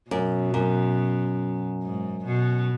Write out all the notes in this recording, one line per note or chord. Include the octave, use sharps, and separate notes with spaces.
F#2 B2
F#2
G#2
B2